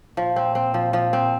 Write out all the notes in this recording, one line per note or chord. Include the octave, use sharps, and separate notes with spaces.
A#2 F3
C4
C4
F3
F3
C4